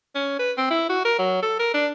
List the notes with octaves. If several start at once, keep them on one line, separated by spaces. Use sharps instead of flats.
C#4
B4
C4
E4
F#4
A#4
F#3
A4
A#4
D4